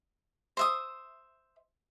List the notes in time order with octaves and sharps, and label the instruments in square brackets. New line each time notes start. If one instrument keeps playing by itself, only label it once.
[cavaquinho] C5 E5 D#6